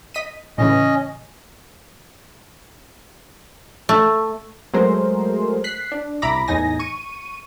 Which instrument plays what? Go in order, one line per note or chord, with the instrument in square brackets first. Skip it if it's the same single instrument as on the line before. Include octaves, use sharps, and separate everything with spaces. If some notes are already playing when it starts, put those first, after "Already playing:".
[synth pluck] D#5 B6 D#7
[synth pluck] A2 C#3 E3 [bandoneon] C#4 D#5
[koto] A3
[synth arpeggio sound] F#3 G#3 A3 G#4 A#4 C5
F#6 B6 C7
D4
C2 E4 A#5 B5 D6 A#6
E2 A2 D#4 G#5 A#6
C#6 D#7